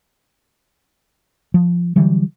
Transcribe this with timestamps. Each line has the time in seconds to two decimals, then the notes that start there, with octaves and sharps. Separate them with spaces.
1.54 F3
1.96 D3 E3 F#3 G3